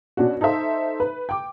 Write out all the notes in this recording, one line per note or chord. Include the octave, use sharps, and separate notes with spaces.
B2 C#4 D4 F#4
D#4 A4 C5 E5
B4
G5 D6